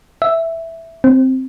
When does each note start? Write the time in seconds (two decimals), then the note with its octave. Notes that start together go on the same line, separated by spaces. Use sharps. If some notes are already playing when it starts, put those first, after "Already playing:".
0.22 E5
1.04 C4